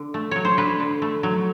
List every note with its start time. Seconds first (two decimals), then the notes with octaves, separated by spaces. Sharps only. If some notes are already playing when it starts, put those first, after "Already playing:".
Already playing: D3
0.14 A3
0.31 F#3 C#5
0.45 C5
0.57 D3 B4
0.80 D3
1.02 A3
1.23 F#3